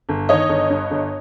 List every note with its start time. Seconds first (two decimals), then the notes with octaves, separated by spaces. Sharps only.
0.09 G1
0.29 D#3 C#5 D#5
0.49 G1
0.70 G2
0.91 G1